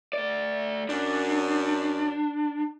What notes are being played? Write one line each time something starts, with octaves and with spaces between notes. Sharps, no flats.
A3 D5
F#2 D4